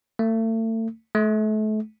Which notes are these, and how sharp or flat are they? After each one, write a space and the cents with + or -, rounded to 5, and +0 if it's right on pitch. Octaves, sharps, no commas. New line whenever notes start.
A3 +35
A3 -35